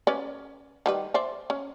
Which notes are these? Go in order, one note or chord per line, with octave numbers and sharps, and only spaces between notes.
C#4 B4 D5
D#3 G3 B4
C5 D5 E5
C#4